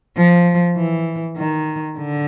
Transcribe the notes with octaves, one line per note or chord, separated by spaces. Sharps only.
F3
E3
D#3
D3